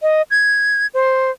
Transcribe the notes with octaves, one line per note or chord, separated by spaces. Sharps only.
D#5
G#6
C5